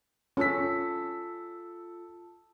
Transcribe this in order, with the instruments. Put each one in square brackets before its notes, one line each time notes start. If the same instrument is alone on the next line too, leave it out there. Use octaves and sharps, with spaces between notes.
[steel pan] C#4 [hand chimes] F4 E6 [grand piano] A4 B6